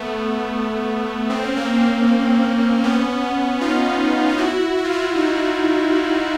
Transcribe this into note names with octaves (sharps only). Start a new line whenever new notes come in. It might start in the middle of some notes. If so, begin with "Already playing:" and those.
Already playing: A3 B3
C4
C#4
A#3 C4
B3 C#4
D#4 F4
F4
E4 F#4
F#4
F4
E4 F#4
D#4 F4